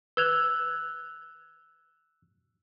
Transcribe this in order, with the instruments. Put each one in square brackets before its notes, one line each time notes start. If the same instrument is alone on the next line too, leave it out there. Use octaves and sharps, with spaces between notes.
[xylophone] B4 G#6 F7 [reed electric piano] E6 F#6